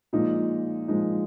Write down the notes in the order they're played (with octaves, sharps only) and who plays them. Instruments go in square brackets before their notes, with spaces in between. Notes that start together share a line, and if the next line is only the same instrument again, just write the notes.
[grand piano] A#2 F3 G#3 D#4
A#2 F3 G#3 D#4